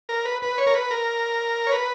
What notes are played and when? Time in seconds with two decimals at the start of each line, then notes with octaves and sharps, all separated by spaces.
0.09 A#4
0.25 B4
0.42 B4
0.58 C#5
0.67 A#4
0.75 B4
0.91 A#4
1.67 C#5
1.72 B4